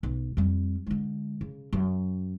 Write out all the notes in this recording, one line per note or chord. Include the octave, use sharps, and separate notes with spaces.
B1
F2 G3
D3 G#3
C#3
F#2